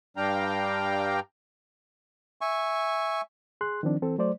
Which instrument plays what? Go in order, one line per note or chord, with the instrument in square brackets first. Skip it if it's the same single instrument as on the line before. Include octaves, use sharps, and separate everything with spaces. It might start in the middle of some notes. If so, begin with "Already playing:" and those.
[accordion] G2 G3 D4 F5 G5 A#5
[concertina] E5 G#5 C#6
[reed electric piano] G#4 C6 F#6
D#3 F3 C4 D4
E3 C4 A4
F#3 A3 C5 D5